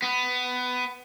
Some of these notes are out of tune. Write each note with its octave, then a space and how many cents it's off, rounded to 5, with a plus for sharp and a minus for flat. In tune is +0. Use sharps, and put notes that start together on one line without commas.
B3 +15